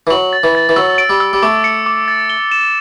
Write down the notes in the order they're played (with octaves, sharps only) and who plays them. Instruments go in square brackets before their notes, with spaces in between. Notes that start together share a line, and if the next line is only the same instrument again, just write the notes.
[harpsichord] E3
[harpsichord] F#3 [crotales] F#7
[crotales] A6
[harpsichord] E3
[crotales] A6
[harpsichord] E3
[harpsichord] F#3 [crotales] E6
[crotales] D7
[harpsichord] G3
[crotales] E6
[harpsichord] G3
[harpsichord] A3 [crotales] D6
[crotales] C#7
D6
A6
G7
E7